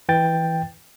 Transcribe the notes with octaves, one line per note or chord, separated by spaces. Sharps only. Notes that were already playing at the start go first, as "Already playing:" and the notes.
E3 G5 A6